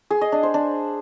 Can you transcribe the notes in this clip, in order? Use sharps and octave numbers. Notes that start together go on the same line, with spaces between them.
G#4
D#5
D4
C5
D4